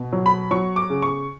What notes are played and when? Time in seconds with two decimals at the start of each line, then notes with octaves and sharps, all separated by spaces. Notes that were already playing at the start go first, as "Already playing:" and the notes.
Already playing: B2
0.12 F#3
0.26 B5
0.51 F#3 C#6
0.76 D6
0.90 C#3
1.02 C#6